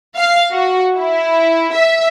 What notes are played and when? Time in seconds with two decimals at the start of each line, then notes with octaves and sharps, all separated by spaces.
0.17 F5
0.52 F#4
0.98 E4
1.74 E5